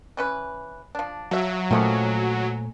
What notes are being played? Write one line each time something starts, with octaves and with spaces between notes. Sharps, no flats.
E3 C#4 B4
F3 D4
F3 F#3 E5
A#2 D#3 F3 A3 C#4